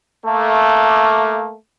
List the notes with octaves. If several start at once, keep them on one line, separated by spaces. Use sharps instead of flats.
A3 A#3